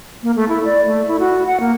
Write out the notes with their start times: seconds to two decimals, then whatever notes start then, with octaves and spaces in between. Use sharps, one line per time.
0.23 A#3
0.36 A3
0.49 E4
0.65 D5
0.86 A3
1.08 E4
1.20 F#4
1.47 F#5
1.60 A#3